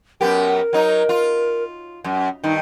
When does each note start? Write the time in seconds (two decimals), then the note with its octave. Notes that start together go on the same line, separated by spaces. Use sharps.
0.21 F#2 B3 G4 A#4
0.73 F#3 D#4
1.09 F4
2.04 F#2
2.44 G2 D#3 D#4